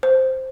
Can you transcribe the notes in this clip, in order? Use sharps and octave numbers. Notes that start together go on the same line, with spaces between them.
C5